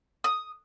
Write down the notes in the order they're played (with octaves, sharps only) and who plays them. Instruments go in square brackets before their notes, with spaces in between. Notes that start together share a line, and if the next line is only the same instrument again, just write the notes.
[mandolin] D#6